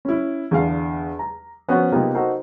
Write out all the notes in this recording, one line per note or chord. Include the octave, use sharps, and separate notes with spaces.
C#4 E4
E2 D3 F5
A#5
F3 B3 C#4 F#4 C5 C#5
C3 A#3 B3 D#4 F4 G4
D#4 F#4 A4 A#4 C5 D#5